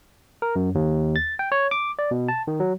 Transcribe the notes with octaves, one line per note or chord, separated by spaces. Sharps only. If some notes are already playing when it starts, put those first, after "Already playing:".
A#4
F#2
D#2
A6
G5
C#5
D6
D5
B2
A5
D#3
F#3